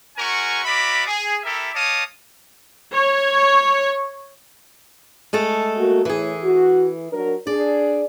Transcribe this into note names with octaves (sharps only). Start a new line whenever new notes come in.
G#3 C#4 F#4 A#4 G#5 C#6
F#4 A#4 D5 E5 B5 D6
G#4
E4 G4 A4 A#4 E5
C#5 D#5 F5 A5 D6 D#6
C#5
G#3 A3 A4
A#3 F#4
A2 E3 G#4
F#4
F#3 D4 A#4
D4 G#4 D5